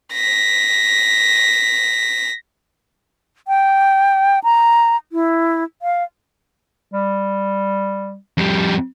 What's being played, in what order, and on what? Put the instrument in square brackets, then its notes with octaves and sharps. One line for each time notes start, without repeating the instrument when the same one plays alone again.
[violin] A#6 B6
[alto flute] G5
A#5
E4
F5
[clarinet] G3
[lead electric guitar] F2 G3